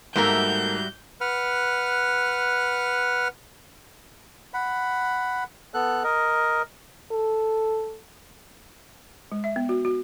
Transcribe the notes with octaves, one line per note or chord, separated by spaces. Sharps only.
G#2 G3 A3 A#3 F#4 A#4 E5 G6
B4 F#5 F6
F#5 B5
B3 A4 F#6
A#4 D#5
A4
G#3
E5
B3
F#4
F#4